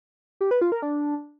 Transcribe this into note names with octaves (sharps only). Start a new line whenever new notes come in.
G4
B4
F4
A#4
D4